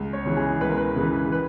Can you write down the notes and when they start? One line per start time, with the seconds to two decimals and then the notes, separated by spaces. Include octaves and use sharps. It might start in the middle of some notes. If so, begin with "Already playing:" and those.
Already playing: C#2
0.13 C#5
0.25 C#3 E3
0.37 G#4
0.61 C#2 B4
0.69 A#4
0.78 B4
0.96 C#3 E3
1.32 B4